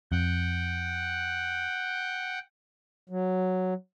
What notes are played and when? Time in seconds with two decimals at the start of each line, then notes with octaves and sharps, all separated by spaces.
0.12 F2 F#5 G5
3.10 F#3